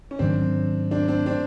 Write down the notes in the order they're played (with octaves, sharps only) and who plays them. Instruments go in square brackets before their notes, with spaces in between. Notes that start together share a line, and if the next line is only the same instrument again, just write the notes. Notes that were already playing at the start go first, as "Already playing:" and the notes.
[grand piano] C#4
[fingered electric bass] G#2 D#3 F#3 [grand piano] C4 D4
[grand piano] C4 D4
C4 D4
C4 D4